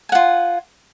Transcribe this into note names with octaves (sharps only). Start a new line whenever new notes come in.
F4 F#5 G#5